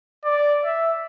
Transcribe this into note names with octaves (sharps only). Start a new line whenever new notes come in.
D5
E5